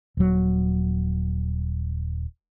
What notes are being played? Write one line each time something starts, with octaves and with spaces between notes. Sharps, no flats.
D#1 F#3